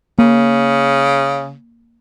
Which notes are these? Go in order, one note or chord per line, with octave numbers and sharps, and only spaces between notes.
C#3 A#3